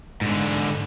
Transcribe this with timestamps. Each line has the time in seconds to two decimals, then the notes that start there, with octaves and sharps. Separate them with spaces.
0.21 G#2 D3